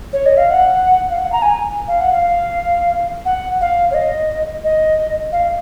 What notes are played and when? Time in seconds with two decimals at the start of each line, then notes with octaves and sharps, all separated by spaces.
0.13 C#5
0.26 D#5
0.37 F5
0.50 F#5
1.10 F5
1.19 F#5
1.32 A#5
1.42 G#5
1.88 F5
2.00 F#5
2.13 F5
3.25 F#5
3.61 F5
3.91 C#5
3.94 D#5
4.64 D#5
5.32 F5